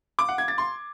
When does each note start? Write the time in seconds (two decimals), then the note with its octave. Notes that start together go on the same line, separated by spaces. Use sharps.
0.19 D6
0.28 F#5
0.38 G#6
0.48 A6
0.58 C6